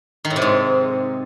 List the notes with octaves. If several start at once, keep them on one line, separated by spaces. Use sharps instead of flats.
D#3
A2
C3
G#2